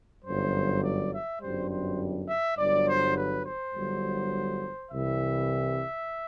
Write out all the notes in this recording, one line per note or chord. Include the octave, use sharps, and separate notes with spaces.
G1 F#2 F#3 C5
D5
E5
G1 F#2 D3 G3 C5
C5
E5
G1 G2 F#3 D5
C5
B4
C5
G1 G2 F#3
C2 C3 E3 G3 E5